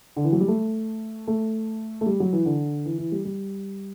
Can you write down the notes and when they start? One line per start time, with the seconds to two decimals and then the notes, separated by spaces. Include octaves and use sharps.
0.16 D3
0.24 E3
0.32 F#3
0.41 G3
0.48 A3
1.27 A3
2.01 A3
2.06 G3
2.20 F#3
2.33 E3
2.46 D3
2.86 E3
2.98 E3
3.12 G3
3.25 G3